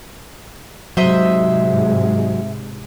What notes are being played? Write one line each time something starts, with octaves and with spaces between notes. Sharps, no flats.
G#2 C3 F#3 G#3 C5 D#5 E5